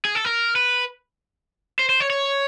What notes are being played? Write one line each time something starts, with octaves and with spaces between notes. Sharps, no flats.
G#4
A4
A#4
B4
C5
C5
C#5
C#5